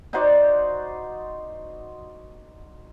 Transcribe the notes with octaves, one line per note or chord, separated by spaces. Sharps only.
D#4 F#4 C5 D5